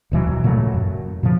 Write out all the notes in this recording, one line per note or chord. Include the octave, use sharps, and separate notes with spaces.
D#1 B2 E3 F#3
A#2 C#3 F#3 A3
F#2
A#2 C#3 F3